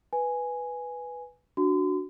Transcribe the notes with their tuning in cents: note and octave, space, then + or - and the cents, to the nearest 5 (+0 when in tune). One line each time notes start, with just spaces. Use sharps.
B4 +0 G#5 +0
D4 +0 F#4 +0 C6 -40